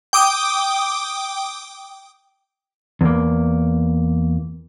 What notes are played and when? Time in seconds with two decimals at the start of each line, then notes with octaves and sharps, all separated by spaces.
0.13 G5 D6 D#6
3.01 E2 A#3